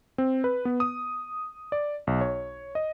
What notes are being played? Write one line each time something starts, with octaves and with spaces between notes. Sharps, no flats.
C4
B4
B3
D#6
D5
B1
C#5
D#5